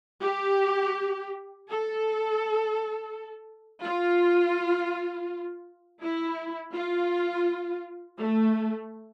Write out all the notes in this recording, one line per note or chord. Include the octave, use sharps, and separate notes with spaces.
G4
A4
F4
E4
F4
A3